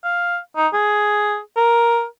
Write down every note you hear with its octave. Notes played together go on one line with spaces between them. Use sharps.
F5
D#4
G#4
A#4